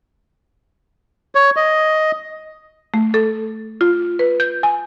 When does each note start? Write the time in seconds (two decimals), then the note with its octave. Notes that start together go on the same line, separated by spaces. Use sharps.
1.35 C#5
1.56 D#5
2.94 A3
3.14 A4
3.81 F4
4.19 B4
4.40 G6
4.63 G#5